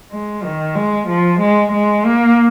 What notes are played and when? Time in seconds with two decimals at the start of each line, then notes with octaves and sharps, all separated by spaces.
0.12 G#3
0.44 D#3
0.75 G#3
1.08 F3
1.40 G#3
1.72 G#3
2.05 A#3